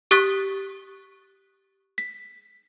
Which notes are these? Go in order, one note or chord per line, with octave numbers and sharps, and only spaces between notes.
G4 C#6 D#6 F#6 A6 B6
B6